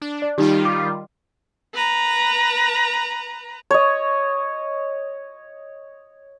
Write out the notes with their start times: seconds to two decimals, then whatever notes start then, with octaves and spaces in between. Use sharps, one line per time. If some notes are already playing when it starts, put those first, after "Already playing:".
0.02 D4
0.22 D5
0.38 D#3 G3 D#4 F4 G4
0.65 D6
1.74 B4 A#5
3.71 C#5 D#5